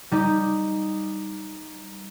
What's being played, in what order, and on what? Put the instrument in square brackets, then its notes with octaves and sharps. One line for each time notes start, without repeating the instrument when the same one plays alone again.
[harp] G3 D#4 G4